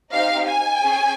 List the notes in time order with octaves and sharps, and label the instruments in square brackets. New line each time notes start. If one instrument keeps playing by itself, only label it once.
[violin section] C4 D#4 G4 F5
G#5
C#4 G#4